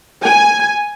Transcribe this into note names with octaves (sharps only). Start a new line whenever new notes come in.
G#5